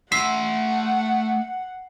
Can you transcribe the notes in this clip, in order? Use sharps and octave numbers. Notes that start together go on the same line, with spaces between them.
A3 E5 F#5 C6 C7